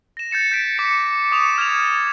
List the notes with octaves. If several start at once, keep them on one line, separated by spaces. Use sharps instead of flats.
A#6 E7
G6 A6 C#7 E7
G6 B6 D7
D6 B6 C#7
C#6 D#6 C#7 E7 F7
F6 G#6 A6 E7 F7